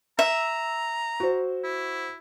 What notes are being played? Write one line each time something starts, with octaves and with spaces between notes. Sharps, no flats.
E5 A#5
F#4 C5
E4